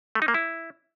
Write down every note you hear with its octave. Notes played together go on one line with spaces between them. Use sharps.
A3
D#4
A#3
E4